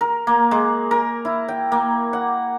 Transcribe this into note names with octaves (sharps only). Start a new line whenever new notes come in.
A#4
A#3
G#3
A#4
E4
G5
A#3
F#5